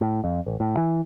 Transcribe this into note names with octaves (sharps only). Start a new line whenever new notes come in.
A2
F2
A1
A2
E3